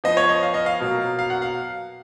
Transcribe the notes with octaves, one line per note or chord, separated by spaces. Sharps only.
F3 B3 D#5
C#5
D#5
F5
D#5
F5
B2 F#3 A#3
F5
F#5
F5